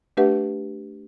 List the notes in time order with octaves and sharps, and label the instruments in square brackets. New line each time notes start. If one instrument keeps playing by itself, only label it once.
[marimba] A3 D4 G4 B4 E5 F#5